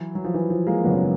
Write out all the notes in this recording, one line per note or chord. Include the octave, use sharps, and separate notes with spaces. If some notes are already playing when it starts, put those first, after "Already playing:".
Already playing: E3 F#3
F#3
F3
E3
F3
G#3 A#3
G#1 F#2 C#3 F#3 B3